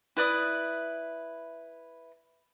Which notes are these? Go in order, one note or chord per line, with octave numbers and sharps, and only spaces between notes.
E4 B4 D5 D#6